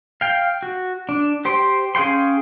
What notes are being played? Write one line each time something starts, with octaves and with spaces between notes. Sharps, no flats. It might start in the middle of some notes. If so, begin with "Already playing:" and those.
F5 G5
F#4
D4
G4 C5 G5 C6
C#4 G#4 F5 G5 C6